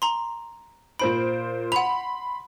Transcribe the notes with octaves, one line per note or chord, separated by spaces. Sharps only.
A#5 C6
A#2 C5 B5 D7
F#5 B5 C6 F7